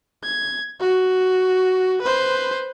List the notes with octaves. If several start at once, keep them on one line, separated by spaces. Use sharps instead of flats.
G#6
F#4
B4 C5